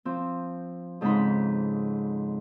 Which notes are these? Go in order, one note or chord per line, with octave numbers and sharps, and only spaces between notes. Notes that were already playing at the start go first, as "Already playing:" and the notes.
F3 C4
F2 G#2 C#3 C4 D#4 B5